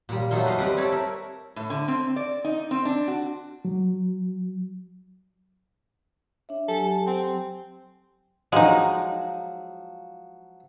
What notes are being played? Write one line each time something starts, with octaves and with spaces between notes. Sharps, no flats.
A#2 G3
F#3 A3 D#4 F4
B4 C5 D#5 F5
G3 C4 B4 D5
G4 A4 C#5 D5 A5
A#4 E5
A2
D3
C4
D5
D#4
C4
D4
F#4
F#3
D4 C#5 E5
F#3 G4 A4 G#5
C4
F3 F#3 G#3 D#4